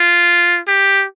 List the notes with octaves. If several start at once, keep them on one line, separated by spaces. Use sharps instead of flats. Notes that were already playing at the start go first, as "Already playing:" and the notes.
Already playing: F4
G4